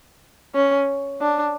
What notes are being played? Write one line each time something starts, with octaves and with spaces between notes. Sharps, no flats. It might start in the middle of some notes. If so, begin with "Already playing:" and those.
C#4
D4